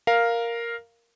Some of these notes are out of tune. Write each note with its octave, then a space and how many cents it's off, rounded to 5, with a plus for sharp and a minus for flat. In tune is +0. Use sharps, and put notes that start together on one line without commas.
A#4 +0 F5 +0